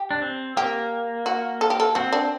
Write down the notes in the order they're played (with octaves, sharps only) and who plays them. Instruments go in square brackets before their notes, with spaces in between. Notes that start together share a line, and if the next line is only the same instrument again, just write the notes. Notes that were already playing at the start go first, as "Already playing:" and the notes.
Already playing: [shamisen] G4
[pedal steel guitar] D4
C4
[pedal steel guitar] A#3 [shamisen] G4
[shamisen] F#4
A4
G4
A4
[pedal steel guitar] C4 [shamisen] F#4
[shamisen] D4